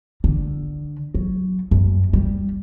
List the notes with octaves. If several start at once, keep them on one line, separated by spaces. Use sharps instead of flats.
D3
F#3
F#2
G3